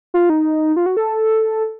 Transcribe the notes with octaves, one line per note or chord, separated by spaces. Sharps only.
F4
D#4
F4
F#4
A4